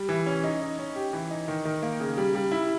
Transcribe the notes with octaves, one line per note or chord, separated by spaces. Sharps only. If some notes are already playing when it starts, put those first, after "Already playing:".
Already playing: G3
E3
C#4
D#4
D#4
C#4
G4
E3
D#4
D#3
D#3
A#3
C#3
G3
G3
E4